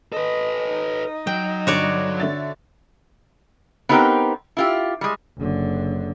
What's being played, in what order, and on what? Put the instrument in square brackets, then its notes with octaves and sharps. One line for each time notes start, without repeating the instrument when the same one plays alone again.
[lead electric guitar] A4 B4 [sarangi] D#5
[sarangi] D#4
[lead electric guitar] F#3 [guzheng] G5
[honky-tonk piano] G2 D3 F7 [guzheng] F#4 C#5 D5
[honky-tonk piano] D3 E5 A6
[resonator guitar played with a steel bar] B3 C4 D#4 G4 A#4 G5
E4 F4 G4
G3 G#3
[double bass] F#1 D3